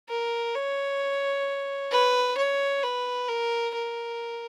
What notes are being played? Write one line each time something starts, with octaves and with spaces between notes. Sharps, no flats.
A#4
C#5
B4
C#5
B4
A#4
A#4